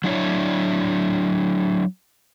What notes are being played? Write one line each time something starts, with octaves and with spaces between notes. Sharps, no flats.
F#3 D4 E4 C#5